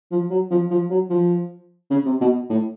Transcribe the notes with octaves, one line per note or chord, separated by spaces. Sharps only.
F3
F#3
F3
F3
F#3
F3
C#3
C3
B2
A2